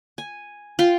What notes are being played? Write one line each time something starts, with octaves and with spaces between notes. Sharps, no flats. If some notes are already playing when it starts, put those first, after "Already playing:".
G#5
F4 G5 C6